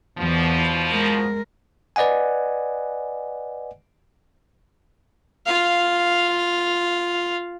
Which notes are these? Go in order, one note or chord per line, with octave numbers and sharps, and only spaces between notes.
E2 B2 E3 F3
G#3 A#4
B4 D5 D#5 F#5 G#5
F4 F5